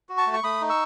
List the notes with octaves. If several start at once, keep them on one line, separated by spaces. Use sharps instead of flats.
F#4
A5 C#6
A3
C#6
A3 B5 D#6
D#4
C#6 E6